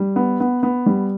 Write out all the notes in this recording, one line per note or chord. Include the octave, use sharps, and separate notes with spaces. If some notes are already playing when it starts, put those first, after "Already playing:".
Already playing: G3
B3
B3
B3
G3